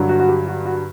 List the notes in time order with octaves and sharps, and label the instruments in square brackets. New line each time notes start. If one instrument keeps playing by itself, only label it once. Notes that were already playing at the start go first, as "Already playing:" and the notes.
Already playing: [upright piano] G2 D3 F#3
F#4
F#4
G4
F#4
F#4